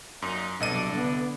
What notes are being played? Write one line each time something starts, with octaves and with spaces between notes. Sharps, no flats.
F#2 A#2 D#4
C2 B2 F#3 D4 A4 D5 D#5 D#7
D3 B3